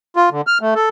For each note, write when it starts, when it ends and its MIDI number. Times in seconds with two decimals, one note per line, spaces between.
0.16 0.29 65
0.31 0.41 50
0.47 0.58 89
0.61 0.74 57
0.75 0.89 69